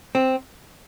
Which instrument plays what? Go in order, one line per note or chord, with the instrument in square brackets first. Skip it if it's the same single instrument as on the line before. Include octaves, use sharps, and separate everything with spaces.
[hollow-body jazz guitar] C4